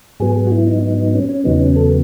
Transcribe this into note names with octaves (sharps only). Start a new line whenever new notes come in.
G#2 F#3 B3 G#4
G#4
F#4
E4
D#4
D#4
D#4
C#4
C#4
E2 C#3 F#3 B3 D#4
C#4
A4